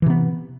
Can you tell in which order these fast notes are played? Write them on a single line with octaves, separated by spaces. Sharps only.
E3 C3 B3